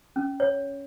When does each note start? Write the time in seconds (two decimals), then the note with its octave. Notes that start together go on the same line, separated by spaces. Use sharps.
0.16 C#4
0.40 C#5